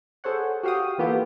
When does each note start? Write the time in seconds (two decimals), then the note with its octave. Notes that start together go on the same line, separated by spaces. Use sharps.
0.24 G#4 A4 C5 C#5 F#5
0.63 F#4 G4 F5 G5 D#6
0.98 E3 A#3 B3 F4 G4 A4